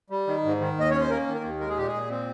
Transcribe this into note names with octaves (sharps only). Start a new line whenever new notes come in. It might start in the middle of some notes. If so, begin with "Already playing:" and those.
G3
D#3
G#2
D#3
D#2 D#5
C#4 C#5
C5
A#3 A#4
D#3
A#4
D#2
G#3 A#4
G#4
A#2 G4
G#4
A#2
C4